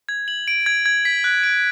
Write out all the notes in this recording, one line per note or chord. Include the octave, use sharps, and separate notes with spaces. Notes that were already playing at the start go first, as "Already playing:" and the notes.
G#6
F#7
D7
G#6
G#6
B6
F#6
D7